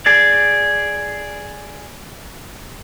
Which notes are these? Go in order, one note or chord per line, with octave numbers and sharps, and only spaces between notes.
G#4 D5